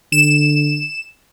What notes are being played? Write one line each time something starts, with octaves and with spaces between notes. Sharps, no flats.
D3 E7